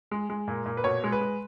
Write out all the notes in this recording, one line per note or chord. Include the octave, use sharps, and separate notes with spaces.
G#3
G#3
A#2
A#2
B4
B2 C#5
G#3
B4
G#3